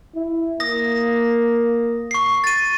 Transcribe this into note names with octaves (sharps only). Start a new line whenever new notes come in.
E4
A#3 D#6 A#6
C#6 C7
A6 D#7